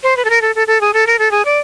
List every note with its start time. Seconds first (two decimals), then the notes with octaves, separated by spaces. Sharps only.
0.03 C5
0.17 B4
0.25 A4
0.30 A#4
0.42 A4
0.55 A4
0.67 A4
0.81 G#4
0.94 A4
1.07 A#4
1.19 A4
1.31 G#4
1.45 D5